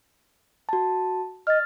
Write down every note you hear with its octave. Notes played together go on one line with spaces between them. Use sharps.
F#4 A5
D#5 F6 A6